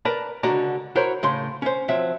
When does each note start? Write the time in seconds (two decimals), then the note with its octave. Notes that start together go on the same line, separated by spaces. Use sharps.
0.05 A#4 B4 D5 A5
0.43 C#2 D3 F#4 D5 A#5
0.96 E4 F#4 A#4 C5 C#5
1.23 A2 C#3 C6
1.62 C#4 C5
1.88 F3 F#3 C4 E5